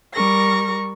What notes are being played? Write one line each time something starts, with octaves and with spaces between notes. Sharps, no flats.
G3 A#4 C#6 A#6